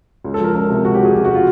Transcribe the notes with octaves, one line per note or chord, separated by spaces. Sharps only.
C#2
A4
F3 A#4
C#2 A#4
C3
C#2 F#4
G4
F3
G#4
C#2 G4
F#4
C3 F4